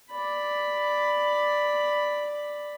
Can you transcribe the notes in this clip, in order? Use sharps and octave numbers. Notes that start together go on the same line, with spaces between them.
D5 B5